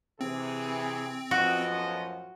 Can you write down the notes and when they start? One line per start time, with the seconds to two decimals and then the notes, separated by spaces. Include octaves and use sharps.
0.21 C3 E3 C4 G#4
1.31 F#2 A2 F3 B3 F#4 D#5